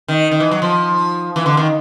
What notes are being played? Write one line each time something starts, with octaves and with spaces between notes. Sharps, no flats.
D#3
D#3
E3
F#3
F3
E3
D3
D#3